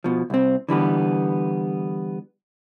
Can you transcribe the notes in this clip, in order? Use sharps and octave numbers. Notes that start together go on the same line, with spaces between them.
B2 F3
C2 C4
D3 E3 G3 B3